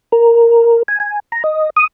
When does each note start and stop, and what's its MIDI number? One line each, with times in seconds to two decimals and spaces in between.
0.12 0.83 70
0.88 1.00 80
1.00 1.20 80
1.32 1.43 82
1.44 1.70 75
1.76 1.87 87